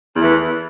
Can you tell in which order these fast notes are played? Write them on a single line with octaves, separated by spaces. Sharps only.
E2 A3 E3